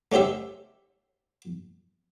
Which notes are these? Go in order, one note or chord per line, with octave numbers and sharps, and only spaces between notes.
A3 C#4 G4 C5 E5